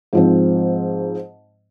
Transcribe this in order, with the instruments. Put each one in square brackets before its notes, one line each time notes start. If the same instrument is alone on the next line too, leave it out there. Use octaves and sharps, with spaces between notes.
[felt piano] G#2 F3 C4